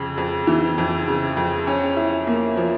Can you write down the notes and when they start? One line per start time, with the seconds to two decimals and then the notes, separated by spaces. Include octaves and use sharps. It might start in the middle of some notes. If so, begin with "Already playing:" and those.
Already playing: F2 C#3
0.18 F2
0.47 E3
0.78 F2
1.08 C#3
1.37 F2
1.67 C#4
1.97 E4
2.27 A#3
2.57 F3